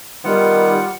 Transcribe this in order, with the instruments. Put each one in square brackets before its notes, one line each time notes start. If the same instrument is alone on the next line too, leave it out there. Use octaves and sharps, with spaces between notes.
[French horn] D#3 [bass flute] G3 [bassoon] B3 [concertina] F4 F#5